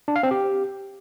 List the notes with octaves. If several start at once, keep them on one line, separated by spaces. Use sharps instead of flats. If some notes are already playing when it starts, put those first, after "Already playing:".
D4
F5
C4
G4